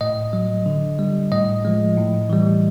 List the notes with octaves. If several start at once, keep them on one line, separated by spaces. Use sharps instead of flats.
A2 D#5
F#3
D3
G3
A2 D#5
F3 G#3
A2
E3 G3